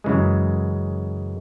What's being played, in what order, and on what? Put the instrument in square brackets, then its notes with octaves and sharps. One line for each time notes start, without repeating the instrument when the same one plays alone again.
[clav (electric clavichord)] F#2 C#3 E3 G#3